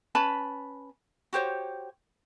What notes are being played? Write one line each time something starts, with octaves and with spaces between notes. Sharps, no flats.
C#4 B4 A5 B5
F#4 G4 C5 C#5